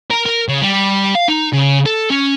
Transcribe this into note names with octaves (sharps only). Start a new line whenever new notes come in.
A#4
A#4
C#3
G3
F5
D#4
C#3
A4
C#4